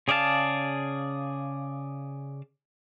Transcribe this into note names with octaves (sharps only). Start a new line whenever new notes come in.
C#3 G#4 D5 F5 A5